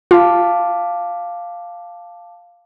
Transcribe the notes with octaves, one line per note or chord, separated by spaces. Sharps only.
F4 F5 A5 D6